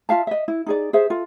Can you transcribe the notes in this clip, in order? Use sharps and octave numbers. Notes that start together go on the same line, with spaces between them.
F4 E5 F5 A5
D#5 E5
E4
D#4 G#4 D5
G#4 C5 E5
F4 A4